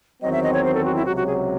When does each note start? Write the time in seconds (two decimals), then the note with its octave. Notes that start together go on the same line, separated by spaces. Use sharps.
0.22 E2 D#3 F#3 C4 D#5
0.32 E5
0.43 D#5
0.54 C#5
0.64 C5
0.74 A4
0.85 F#4
0.95 E4
1.05 C#2 C3 F#3 F#4
1.16 F#4
1.27 G#4